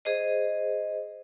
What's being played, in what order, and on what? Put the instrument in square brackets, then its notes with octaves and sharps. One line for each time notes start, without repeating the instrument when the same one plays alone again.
[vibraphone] G#4 C5 D#5